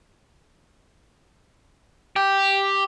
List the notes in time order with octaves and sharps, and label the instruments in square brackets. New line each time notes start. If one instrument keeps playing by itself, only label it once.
[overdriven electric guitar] G4